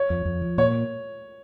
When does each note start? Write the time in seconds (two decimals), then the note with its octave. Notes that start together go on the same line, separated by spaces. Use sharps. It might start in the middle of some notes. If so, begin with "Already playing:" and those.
Already playing: C#5
0.10 F2
0.25 F2
0.42 F3
0.58 A#2 C#5